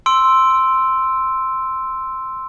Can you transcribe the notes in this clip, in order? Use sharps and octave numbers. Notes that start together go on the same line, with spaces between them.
C6 E6 D7